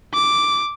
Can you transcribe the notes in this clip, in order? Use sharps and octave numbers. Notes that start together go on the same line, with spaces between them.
D6